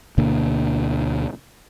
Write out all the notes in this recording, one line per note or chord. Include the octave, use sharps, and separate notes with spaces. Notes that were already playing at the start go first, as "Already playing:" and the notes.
D2 B2 D3 A#3